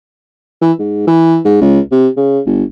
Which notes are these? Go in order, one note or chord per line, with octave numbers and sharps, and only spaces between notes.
E3
G#2
E3
G#2
C#2
C3
C#3
G1